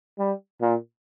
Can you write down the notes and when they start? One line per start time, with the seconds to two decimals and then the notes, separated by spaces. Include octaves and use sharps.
0.19 G3
0.62 A#2